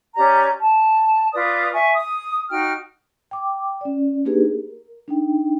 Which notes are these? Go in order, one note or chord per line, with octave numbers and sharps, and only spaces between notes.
C#4 G4 D5 A#5
A5
F4 B4 D5 D#6
E5 G#5 C#6
D#6
D#4 F#4 G5 F6
G5 D6
C#4 D5
A#3 D4 D#4 G4 G#4 B4
A#4
D4 D#4 G5